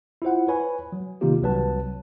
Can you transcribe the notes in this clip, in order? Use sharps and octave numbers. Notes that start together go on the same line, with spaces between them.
E4 F4 C5 F#5
B4 C#5 G#5 B5
F#3
C3 D#3 A#3 D#4 F4 G4
C2 F#3 B4 A5